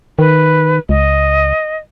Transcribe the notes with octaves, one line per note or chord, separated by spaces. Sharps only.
D#3 B4
C#2 D#5